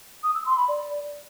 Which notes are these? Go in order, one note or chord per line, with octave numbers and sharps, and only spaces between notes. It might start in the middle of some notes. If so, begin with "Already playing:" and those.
D#6
E6
C6
B5
D5